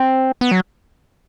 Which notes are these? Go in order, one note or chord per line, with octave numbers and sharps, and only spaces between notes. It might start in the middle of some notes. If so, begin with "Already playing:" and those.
Already playing: C4
B3
F#3